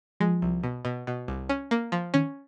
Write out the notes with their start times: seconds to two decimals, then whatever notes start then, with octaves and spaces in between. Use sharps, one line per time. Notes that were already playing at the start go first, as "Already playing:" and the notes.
0.20 F3 G#3
0.42 C2
0.63 B2
0.85 B2
1.07 B2
1.28 C2
1.49 C#4
1.71 A#3
1.92 F3
2.14 D#3 C#4